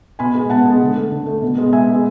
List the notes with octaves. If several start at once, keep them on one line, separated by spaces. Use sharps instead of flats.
B2 G#5 B5
G#3 B3
B2 F#5 A5
G#3 B3
D3
A3
D3
A3
B2
G#3 B3
B2 E5 G#5
G#3 B3